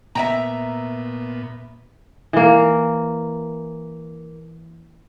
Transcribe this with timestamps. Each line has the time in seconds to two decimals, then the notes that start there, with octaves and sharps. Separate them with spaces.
0.15 A#2 B3 E5 G5 A#5
2.33 E3 A#3